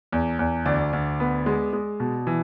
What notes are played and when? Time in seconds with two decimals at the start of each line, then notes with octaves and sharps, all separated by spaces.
0.12 E2
0.39 E2
0.66 D2 D5
0.93 D2
1.20 B3
1.46 G#3
1.73 G#3
2.00 B2
2.27 E3